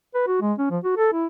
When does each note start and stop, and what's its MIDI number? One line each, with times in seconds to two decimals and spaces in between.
0.15 0.23 71
0.27 0.39 66
0.41 0.53 56
0.58 0.68 61
0.70 0.78 53
0.84 0.95 66
0.97 1.10 69
1.13 1.26 64